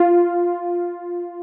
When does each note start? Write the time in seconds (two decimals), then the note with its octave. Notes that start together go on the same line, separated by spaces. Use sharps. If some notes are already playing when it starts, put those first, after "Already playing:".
Already playing: F4